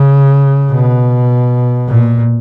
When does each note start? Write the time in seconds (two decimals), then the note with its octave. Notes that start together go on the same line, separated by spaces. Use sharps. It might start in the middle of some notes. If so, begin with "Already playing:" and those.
Already playing: C#3
0.70 B2
1.89 A#2